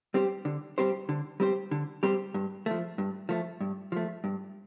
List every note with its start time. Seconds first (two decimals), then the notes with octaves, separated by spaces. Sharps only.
0.14 G3 C4 G4 C5
0.45 D3
0.78 G3 C4 G4 C5
1.09 D3
1.40 G3 C4 G4 C5
1.71 D3
2.03 G3 C4 G4 C5
2.34 G2
2.66 F3 A3
2.98 G2
3.29 F3 A3
3.61 G2
3.92 F3 A3
4.24 G2